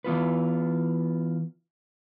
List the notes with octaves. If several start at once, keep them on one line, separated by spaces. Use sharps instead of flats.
E3 B3 F4 B4